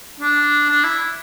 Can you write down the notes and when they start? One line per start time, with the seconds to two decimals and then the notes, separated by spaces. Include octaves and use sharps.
0.20 D4
0.70 D4
0.84 E4